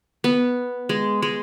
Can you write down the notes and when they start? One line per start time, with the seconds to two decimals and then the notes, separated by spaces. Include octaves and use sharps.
0.24 B3
0.89 G#3
1.22 G#3